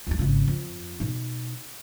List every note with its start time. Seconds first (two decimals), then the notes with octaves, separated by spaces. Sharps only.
0.07 D#2 G3
0.19 G#1 C#3
0.48 F2
1.00 B2 D#4